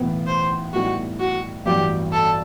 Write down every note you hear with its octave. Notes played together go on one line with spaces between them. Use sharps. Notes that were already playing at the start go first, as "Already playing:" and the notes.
Already playing: B1 A2 E3 B3
C5
A2 G3 B3 D#4 F#4
F#4
A1 G2 F#3 B3 G4
A4